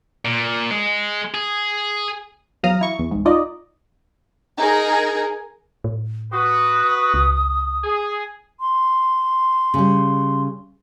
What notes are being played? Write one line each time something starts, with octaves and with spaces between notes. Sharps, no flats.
A#2
G#3
G#4
E2 F#3 F5 A#5 D#6 F6
E4 C#6
E2
C2 G#2
D#4 F4 D5 D#5
D#4 G#4 A#4
A2
F#4 B4 D#6
C#2
G#4
C6
C#3 G3